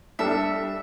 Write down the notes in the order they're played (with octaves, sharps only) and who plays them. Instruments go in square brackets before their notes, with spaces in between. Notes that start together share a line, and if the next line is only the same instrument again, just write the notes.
[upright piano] G3 D4 A4 [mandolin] E5